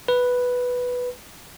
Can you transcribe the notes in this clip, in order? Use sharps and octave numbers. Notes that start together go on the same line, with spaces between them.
B4